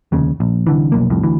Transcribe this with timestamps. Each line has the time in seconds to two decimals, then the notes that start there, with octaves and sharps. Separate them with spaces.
0.12 F1 D#2 C#3
0.40 A#1
0.67 C2 D3 E3
0.92 F1 B1 A#3
1.10 C2 F2 A2
1.23 D2 E3